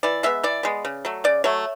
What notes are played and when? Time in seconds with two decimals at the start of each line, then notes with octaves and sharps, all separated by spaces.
0.03 E3 D5
0.23 G#3 B3 E5
0.43 E3 D5
0.63 G#3 B3
0.85 C#3
1.05 F#3 A3
1.24 C#3 D5
1.44 F#3 A3 C#5